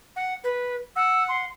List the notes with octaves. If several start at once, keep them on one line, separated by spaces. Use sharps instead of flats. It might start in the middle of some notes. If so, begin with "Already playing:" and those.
F#5
B4
F#5 E6
C6